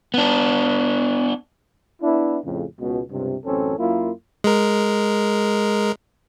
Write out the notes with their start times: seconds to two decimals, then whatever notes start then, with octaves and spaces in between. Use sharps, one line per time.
0.14 B3 D4
2.01 B3 D4 E4
2.43 F2 A2 C#3
2.79 C#2 B2
3.11 C#2 G2 C3
3.45 A1 F#2 C4 C#4 A4
3.78 F#2 A#3 E4 F4
4.44 G#3 A#4